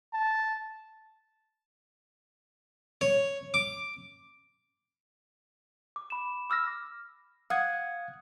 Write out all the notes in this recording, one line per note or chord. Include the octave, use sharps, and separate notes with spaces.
A5
C#5
D6
D6
B5 E7
D6 E6 F6 A#6
F5 F#5 D#6 G#6